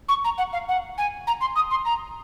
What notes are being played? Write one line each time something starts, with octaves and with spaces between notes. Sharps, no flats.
C#6
A#5
F#5
F5
F#5
G#5
A#5
C6
D#6
C6
A#5